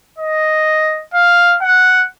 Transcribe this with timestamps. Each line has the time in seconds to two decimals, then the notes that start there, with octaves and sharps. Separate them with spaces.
0.18 D#5
1.14 F5
1.62 F#5